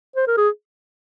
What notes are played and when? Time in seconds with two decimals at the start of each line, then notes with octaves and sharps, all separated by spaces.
0.16 C5
0.27 A#4
0.37 G#4